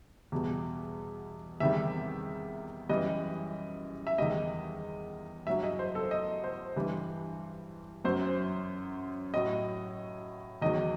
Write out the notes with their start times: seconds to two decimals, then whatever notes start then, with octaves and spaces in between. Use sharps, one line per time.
0.32 E2 B2 G3
1.60 E2 C3 D#3 G3 E5
2.89 F#2 E3 G3 D#5
4.07 E5
4.18 E2 D#3 G3 D#5
5.47 G2 F#3 E5
5.64 D#5
5.79 C5
5.95 A4
6.11 D#5
6.44 C5
6.76 G2 E3 G3
8.04 F#2 F#3 C5
9.34 A2 F#3 D#5
10.62 E2 D#3 F#3 D#5